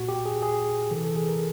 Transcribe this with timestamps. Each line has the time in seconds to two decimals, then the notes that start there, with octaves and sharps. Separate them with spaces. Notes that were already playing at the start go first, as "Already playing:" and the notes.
Already playing: A#2 F#4
0.09 G4
0.26 G#4
0.42 G#4
0.91 C3 E3 A4
1.05 A4
1.16 G#4
1.29 A#4